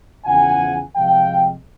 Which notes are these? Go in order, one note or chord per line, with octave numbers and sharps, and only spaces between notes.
E2 C#3 F3 F#5 G#5
C3 F3 G#3 F5 G5